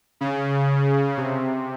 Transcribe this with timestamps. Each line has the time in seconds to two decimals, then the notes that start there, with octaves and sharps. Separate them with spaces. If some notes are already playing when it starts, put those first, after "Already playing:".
0.21 C#3
1.17 C3